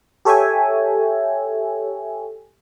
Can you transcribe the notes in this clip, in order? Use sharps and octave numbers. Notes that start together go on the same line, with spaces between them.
G4 A4 C#5 E5 G5 G#5